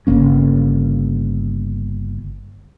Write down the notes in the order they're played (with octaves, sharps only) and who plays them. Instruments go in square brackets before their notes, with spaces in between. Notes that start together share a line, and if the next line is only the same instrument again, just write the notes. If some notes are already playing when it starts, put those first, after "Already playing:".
[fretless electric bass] G1 C#3 A#3 C#4